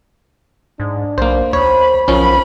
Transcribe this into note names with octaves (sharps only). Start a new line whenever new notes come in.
G#2 D4
B1 A#3 C5
D#2 C5 C#5 B5
B1 F3 C#4 A#4 B5